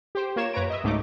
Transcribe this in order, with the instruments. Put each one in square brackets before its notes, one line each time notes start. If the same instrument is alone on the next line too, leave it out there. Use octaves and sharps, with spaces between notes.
[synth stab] G4 C5
A#3 F4 C#5 G#6 E7
F#2 B4 C#5 A#5 D7
D#5 E5
C#2 G#2 F#3 A3 D#4 D6